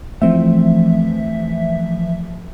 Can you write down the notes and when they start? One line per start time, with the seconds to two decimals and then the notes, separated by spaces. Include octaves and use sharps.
0.22 E3 F3 A3 C4 E5